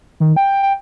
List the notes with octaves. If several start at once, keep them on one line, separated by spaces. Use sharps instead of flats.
D#3
G5
G5